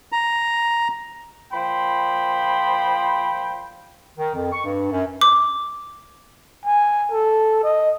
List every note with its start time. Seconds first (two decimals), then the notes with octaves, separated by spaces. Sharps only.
0.12 A#5
1.52 A#2 F3 C5 G5 B5 C6
4.17 D#3
4.35 F2
4.53 C#6
4.65 G2
4.91 F#2
5.21 D6
6.66 G#5
7.11 A4
7.63 D#5